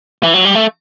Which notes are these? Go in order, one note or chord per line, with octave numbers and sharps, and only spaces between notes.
E3
F#3
G3
A3